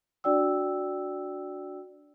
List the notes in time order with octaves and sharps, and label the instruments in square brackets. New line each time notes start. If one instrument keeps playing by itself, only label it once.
[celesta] D4 F#4 D5 G5 E6